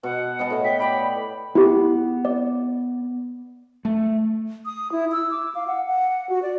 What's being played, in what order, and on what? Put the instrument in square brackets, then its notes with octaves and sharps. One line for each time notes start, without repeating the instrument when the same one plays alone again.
[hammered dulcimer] B2 [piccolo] F#5
[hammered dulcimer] B3 D#5 A5
A2 C#5
[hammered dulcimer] G5 [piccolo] B6
[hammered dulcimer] D5 G5 D6 [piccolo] B5
[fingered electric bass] B3 [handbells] E4 G4
[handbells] D5
[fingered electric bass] A3
[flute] D#6
E4
E6
D6
F5
F#5
F#5
F#4
D5